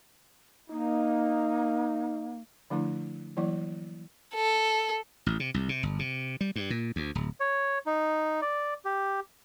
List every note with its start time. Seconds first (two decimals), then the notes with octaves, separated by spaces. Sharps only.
0.70 A#3 D#4
2.70 D3 F3 A3 D4 E4
3.37 E3 F#3 A#3 E4 D5
4.34 A4
5.26 A1
5.40 C3
5.54 C2
5.69 C3
5.83 G1
5.99 C3
6.41 G3
6.56 G2
6.70 A#2
6.96 D2
7.15 D1
7.40 C#5
7.86 D#4
8.42 D5
8.85 G4